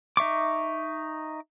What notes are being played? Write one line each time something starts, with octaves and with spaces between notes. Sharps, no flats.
D#4 E5 C#6 D6